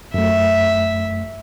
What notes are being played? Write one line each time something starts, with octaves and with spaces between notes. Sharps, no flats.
F#2 A3 E5